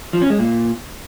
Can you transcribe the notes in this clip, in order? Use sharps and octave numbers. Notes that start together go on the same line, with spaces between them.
F3
C#4
G#3
A#2